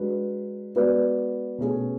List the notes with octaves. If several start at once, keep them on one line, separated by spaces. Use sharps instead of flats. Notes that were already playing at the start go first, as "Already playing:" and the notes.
Already playing: G#3 D4 F#4 B4
G#3 B3 F#4 B4 D5
B2 A3 C#4 G#4